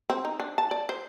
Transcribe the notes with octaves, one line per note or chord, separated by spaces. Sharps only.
C4
D#4
D4
A5
D5
C5